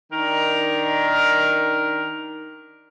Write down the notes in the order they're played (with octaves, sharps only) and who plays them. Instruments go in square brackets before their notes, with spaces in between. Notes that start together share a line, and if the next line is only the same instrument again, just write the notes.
[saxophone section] D#3 D4 D#4 A#4